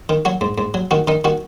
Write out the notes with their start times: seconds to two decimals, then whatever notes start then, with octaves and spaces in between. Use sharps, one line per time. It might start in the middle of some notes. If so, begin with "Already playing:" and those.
0.09 D#3
0.25 F#3 F#4
0.41 G#2
0.58 G#2
0.74 F#3
0.91 D#3 F#4
1.08 D#3 D#4
1.24 D#3 F#4